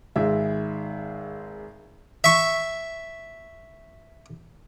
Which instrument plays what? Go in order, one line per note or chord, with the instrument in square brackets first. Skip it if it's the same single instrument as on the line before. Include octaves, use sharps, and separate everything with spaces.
[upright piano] G#1 G#3 E5
[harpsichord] E5 C#6